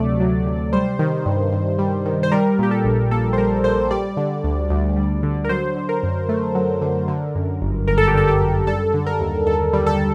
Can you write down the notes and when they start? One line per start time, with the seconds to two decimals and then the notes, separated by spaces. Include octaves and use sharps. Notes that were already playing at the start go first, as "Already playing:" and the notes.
Already playing: D2 C3 F#3 A3 D5
0.20 F#3
0.46 C3
0.73 G3 C5
0.99 D#3
1.26 G2
1.52 G2
1.79 G3
2.05 D#3
2.23 C5
2.32 G3 A#4
2.59 A#2 G4
2.71 A4
2.85 A#1
3.11 A#3 A4
3.33 C5
3.38 G3 A#4
3.64 A#2 C5
3.91 G3 D5
4.17 D3
4.44 D2
4.70 D2
4.96 G3
5.23 D3
5.44 A#4
5.49 F#3 C5
5.76 D3
5.89 A#4
6.03 F#2
6.29 A3
6.55 F#3
6.81 D3
7.08 D3
7.35 F#2
7.61 G1
7.87 G1 A#4
7.98 A4
8.08 G4
8.14 D3 A4
8.27 G4
8.41 F#2
8.67 G3 A4
8.94 D3
9.06 A#4
9.20 D#2
9.46 D#2 A4
9.73 G3
9.86 A4